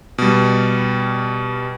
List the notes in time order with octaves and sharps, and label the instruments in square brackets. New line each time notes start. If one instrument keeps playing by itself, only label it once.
[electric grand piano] B2 G3